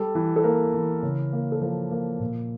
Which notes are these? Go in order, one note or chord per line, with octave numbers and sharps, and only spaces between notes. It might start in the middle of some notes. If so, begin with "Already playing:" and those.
Already playing: G3 A4
E3
A4
A#3 A#4
E3
C#3
A#3
A4
F3 A#4
A#3
A#2